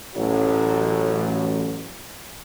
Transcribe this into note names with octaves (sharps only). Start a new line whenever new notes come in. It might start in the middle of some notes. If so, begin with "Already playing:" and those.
A1 F#3